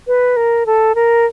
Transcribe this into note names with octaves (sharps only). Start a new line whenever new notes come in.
B4
A#4
A4
A#4